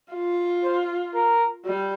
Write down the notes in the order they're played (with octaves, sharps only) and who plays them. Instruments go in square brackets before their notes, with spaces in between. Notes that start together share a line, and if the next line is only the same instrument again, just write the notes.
[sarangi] F4
[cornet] C5
A#4
[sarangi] G3